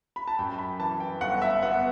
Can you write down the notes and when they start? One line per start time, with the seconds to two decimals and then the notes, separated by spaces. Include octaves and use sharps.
0.16 B5
0.28 A5
0.39 F#2 G5
0.59 B5
0.80 E3 A5
1.00 G5
1.21 G1 F#5
1.42 E5
1.62 B3 F#5